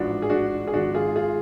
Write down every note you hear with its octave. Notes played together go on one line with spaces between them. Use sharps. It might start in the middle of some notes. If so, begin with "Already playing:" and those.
Already playing: A1 G#2 F3 D4 F#4
G#4
D4 F#4
G#4
G#1 G#2 F3 D4 F#4
F4 G#4
F4 G#4